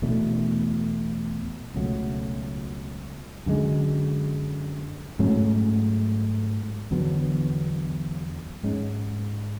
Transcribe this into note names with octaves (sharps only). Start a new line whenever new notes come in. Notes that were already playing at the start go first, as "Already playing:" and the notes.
E2 B2 A3 D4
C#2 B2 F#3 A3
F#2 D3 G#3
G#2 F#3 A3 C#4
E2 D3 F#3 B3
G#2 G#3 C#4